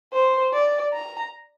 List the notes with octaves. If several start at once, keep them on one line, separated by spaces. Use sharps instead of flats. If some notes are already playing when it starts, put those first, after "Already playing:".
C5
D5
A#5